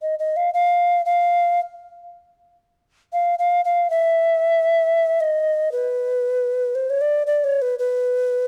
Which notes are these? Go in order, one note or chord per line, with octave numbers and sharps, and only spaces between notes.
D#5
D#5
F5
F5
F5
F5
F5
F5
E5
D#5
B4
C5
C#5
D5
D5
C#5
B4
B4